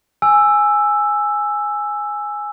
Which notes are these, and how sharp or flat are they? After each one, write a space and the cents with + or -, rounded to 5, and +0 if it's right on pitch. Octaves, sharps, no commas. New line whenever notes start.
G#5 +0 E6 +5